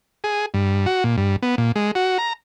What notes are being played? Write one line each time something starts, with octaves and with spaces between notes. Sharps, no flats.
G#4
G2
F#4
A#2
G2
B3
A#2
G#3
F#4
A#5